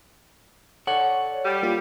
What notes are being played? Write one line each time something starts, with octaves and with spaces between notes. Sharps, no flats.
A4 C#5 D5 F#5
G3
A#3 F4 G4